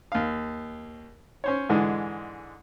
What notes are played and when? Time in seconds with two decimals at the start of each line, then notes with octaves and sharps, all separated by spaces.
0.12 D#2 F5
1.44 C#4 C5 C#5
1.69 G#2 D3 E3 G#3